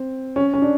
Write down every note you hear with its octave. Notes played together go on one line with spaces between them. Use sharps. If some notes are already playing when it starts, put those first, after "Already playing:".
Already playing: C4
C#4
C#4
D4